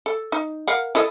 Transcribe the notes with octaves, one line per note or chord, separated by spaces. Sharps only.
A4
D#4
A#4 F5 F#5
E4 A4 D#5